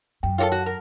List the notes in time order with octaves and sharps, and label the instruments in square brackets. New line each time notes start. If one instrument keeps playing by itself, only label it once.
[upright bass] F#2 [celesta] G5
[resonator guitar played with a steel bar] F4 F#4 A4 [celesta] A#4 C#5 G5
[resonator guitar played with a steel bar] F#4 [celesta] F#5
[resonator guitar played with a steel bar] A#4